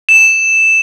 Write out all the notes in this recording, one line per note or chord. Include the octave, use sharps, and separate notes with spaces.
E7